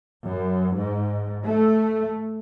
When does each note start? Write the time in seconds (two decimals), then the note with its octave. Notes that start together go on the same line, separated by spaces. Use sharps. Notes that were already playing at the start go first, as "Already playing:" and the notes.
0.24 F#2
0.76 G#2
1.44 A3